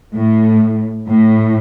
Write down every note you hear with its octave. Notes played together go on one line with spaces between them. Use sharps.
A2
A2